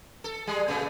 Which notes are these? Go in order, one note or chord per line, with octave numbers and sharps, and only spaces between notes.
A4
G3 G#3 G#4
A#2 C#3 A3